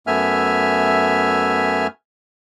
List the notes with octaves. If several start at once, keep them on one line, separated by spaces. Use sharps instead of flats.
F#2 A3 B3 E5 G#5 F6